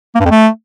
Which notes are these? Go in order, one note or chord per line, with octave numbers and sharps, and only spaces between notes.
A#3
G2
F2
A3